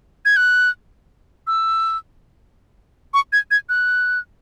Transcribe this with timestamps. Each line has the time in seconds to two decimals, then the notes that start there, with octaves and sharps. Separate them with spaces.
0.25 G#6
0.37 F#6
1.47 E6
3.14 C#6
3.33 G#6
3.51 G#6
3.69 F#6